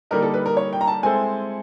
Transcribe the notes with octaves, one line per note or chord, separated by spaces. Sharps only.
D3 G3 A#3 D#4 A#4
A4
B4
A#4
C#5
G5
A#5
A5
G#3 C4 E4 A4 C5 G#5